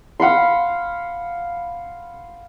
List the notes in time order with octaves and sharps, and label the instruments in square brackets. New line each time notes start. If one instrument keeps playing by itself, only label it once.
[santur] F5 F#5 B5 C6